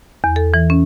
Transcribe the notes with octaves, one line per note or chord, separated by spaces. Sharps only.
E2
A4
E3
C#4